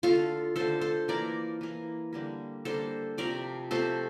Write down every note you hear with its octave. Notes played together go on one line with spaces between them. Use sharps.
D3 A3 F4 A4
D3 A3 A4 C5
A4 C5
E3 A#3 A#4 D5
E3 A#3
D3 G3 A#3
D3 G3 A#3 A4 C5
C3 F3 A3 A#4 D5
C3 F3 A3 A4 C5